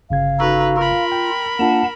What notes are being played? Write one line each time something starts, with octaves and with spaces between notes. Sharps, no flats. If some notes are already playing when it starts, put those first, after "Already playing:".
G1 C#3 F5 G#6
D#4 F#4 A4 B4 A#5
F4 A#4 B5
G5
A#3 D4 F4 F#5 A5